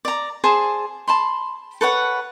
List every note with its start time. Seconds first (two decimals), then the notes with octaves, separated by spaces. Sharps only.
0.05 D5 A#5
0.44 G#4 C5 D5 A5
1.08 A5 B5 C6
1.81 A4 B4 C#5 F#5